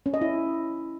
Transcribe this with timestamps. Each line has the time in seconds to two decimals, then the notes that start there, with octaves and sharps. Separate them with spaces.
0.06 C#4
0.14 D#5
0.21 E4